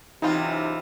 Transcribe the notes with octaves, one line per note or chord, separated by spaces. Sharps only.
F#2 C3 E3 D#4 F4